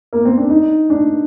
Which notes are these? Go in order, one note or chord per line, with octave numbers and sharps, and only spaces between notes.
A#3
C4
D4
D#4
D4